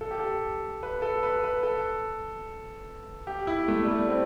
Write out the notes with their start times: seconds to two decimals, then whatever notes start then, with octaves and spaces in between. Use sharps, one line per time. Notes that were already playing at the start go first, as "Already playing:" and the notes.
0.01 A4
0.11 G4
0.20 A4
0.83 B4
1.02 A4
1.23 B4
1.44 B4
1.63 A4
3.27 G4
3.47 E4
3.68 A3
3.83 G3
3.88 A3
4.09 C4